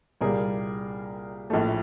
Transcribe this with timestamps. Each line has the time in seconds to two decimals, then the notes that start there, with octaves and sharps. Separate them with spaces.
0.21 C2 A#2 G3 A#3 G#4 A#4
1.50 A#1 A2 F3 A3